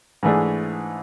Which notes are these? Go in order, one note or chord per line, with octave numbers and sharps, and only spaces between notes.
G#2 E3 A3 D4 G#4